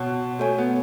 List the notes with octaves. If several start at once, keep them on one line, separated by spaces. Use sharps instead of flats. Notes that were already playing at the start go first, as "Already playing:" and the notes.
Already playing: B2 F#4 C#5 F#5 A5
A3 F#4 C#5 G#5
B3